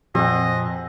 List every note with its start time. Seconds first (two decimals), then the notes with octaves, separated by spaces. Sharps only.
0.15 F2 A#2 C4 G#4 D#5 F#5